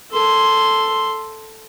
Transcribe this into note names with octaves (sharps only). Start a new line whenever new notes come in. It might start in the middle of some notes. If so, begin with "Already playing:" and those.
A4 C6